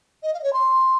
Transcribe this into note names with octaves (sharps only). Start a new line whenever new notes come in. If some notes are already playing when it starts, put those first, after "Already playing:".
D#5
F5
D#5
C#5
C6